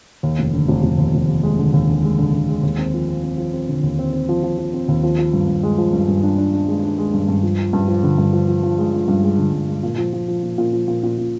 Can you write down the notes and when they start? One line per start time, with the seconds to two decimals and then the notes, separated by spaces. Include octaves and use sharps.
0.23 D#2
0.39 F1
0.53 D3
0.68 F1
0.83 F1
0.98 D#2
1.14 F1
1.29 D#2
1.43 G#3
1.59 D3
1.74 D#2
1.88 D3
2.03 G#3
2.19 D3
2.33 D3
2.49 G#3
2.63 D#2
2.78 C4
2.94 F3
3.09 C4
3.23 C4
3.38 F3
3.53 C4
3.68 D3
3.83 D#2
3.99 C4
4.13 C4
4.29 F3
4.43 F3
4.58 F3
4.74 C4
4.88 D#2
5.03 F3
5.19 F3
5.33 G2
5.48 G2
5.63 G#3
5.78 F3
5.93 G2
6.08 G2
6.23 D4
6.38 D4
6.53 D4
6.68 G#3
6.83 D4
6.98 G#3
7.13 G2
7.29 G2
7.43 F3
7.59 F3
7.73 G2
7.88 F3
8.03 D3
8.18 G2
8.33 F3
8.48 F3
8.63 F3
8.78 G#3
8.93 F3
9.08 G2
9.23 G#3
9.38 D3
9.53 G2
9.68 G#3
9.83 A#2
9.98 F3
10.13 F3
10.28 F3
10.43 A#2
10.58 A#2
10.73 F3
10.88 A#2
11.03 A#2
11.18 A#2